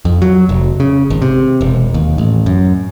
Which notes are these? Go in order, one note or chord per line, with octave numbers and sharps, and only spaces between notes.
F2
F#3
F1
C#3
G#1
C3
E1
D#2
A1
F#2